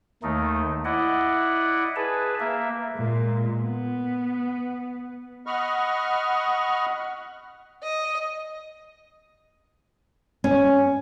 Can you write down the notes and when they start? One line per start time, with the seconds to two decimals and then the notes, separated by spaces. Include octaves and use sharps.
0.23 D#2 D#3 A3 D#4
0.85 E4 D5 D#5 F#5
1.96 G#4 B4 A5
2.40 A#3 E5
2.93 A#2 G#3
3.60 B3
5.46 D#5 F#5 B5 C#6 F6
7.83 D#5
10.44 C#4